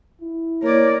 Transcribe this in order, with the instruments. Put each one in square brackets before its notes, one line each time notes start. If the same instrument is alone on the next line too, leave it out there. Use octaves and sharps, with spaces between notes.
[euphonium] E4
[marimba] A#3 [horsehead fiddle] A#4 D5 [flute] C#5